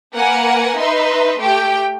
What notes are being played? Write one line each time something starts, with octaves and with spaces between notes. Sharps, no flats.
A#3 A#4 B4 F#5 G#5
D#4 B4 E5 C6
A3 G4 G5